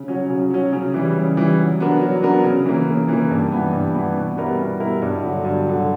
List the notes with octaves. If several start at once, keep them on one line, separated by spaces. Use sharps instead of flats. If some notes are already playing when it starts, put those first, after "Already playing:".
Already playing: C#3
F#3 C#4
C#3
F#3 C#4
C#3
E3 G3
C#3
E3 G3
F#3
B3 D4 A#4
F#3
B3 D4 A#4
C#3
E3 A#3
C#3
E3 A#3
G2
E3 B3
G2
E3 B3
B2
G3 B3 E4 A#4
B2
G3 B3 E4 A#4
G2
D3 F#3
G2
D3 F#3